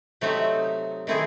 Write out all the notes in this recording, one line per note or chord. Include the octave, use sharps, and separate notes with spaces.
C3 F#3 A3 C4 D#4
D#3 A3 C4 E4 G#4